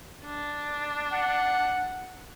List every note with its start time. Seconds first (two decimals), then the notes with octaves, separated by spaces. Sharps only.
0.25 D4
1.12 F#5